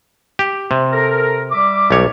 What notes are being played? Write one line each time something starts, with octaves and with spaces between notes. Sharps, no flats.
G4
C3
A4 A#4
G3 E5 D6
B1 C#5